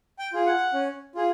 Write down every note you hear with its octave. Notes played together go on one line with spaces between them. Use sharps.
G5
F4 G#4
F#5
C#4
F4 G#4